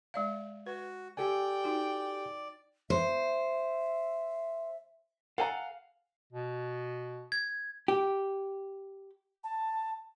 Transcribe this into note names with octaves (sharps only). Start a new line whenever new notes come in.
G#3 D5 F5
F#4 B4
G4 A4 D5 G5 G#5
D#4 F#4
C5 E5
A4 F5 F#5 G#5 A#5
B2
G#6
G4
A5